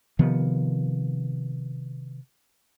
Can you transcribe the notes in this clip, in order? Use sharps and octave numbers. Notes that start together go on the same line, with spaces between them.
C3 D#3 F3 B3